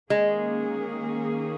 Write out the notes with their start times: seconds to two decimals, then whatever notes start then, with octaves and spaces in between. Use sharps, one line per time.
0.10 D#3 G#3 A#3 C#4 G#4